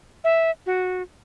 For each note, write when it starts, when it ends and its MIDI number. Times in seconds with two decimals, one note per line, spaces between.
0.24 0.51 76
0.66 1.02 66